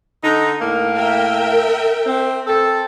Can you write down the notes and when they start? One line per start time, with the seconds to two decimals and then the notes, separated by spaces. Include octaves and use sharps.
0.23 D3 D#4
0.60 A2 A#3
0.95 A#4 E5 G5
2.06 C4
2.46 C4 A4